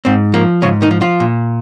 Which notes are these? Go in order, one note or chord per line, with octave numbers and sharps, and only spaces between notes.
G#2 C4
F3 A#3
G#2 C#3 C#4
D#3 D#4
F3
F3 F4
A#2